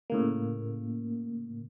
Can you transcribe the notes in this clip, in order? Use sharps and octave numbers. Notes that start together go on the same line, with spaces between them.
A2 C#3 A#3